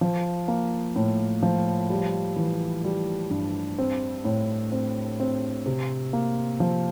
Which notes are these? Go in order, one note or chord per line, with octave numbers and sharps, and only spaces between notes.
F3
A#3
A2
F3
G3
E3
G3
G2
C4
A2
C4
C4
C3
A#3
F3